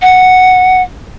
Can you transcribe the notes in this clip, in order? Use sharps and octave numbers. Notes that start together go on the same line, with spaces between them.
F#5